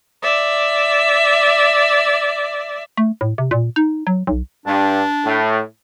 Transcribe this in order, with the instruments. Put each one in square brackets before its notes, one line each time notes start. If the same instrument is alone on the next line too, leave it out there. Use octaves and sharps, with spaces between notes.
[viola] D5 E5
[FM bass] A3
A2
C3
A#2
D#4
F#3
B1
[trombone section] G2 [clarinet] D4
[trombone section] A2